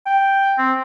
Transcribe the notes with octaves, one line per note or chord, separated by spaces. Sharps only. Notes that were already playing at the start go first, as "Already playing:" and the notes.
G5
C4